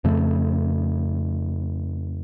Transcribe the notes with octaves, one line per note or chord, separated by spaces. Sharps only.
F2 C#3 A3